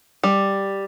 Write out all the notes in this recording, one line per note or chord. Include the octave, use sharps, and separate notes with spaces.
G3